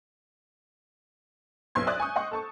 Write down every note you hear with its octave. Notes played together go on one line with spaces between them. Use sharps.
F#1 B1 B3 C6 G#6
D5 E5 D#6 F#6
G#5 C#6 D#6 G6
D#5 F#5 C6 C#6
A4 A5 C#6